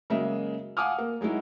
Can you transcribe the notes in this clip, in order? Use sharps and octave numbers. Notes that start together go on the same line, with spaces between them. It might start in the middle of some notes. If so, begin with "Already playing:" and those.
C#3 F#3 G#3 A#3 D#5 E5
F5 F#5 G#5 D6 D#6 F6
A#3
F#3 G#3 D#4 E4 F#4